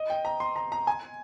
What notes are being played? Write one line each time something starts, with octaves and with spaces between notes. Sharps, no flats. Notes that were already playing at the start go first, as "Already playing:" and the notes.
Already playing: D#5
G5
A#5
C6
A#5
A#5
G#5